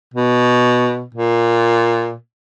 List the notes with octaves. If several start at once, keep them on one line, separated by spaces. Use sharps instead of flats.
B2
A#2